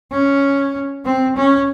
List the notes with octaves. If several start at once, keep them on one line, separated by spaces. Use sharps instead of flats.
C#4
C4
C#4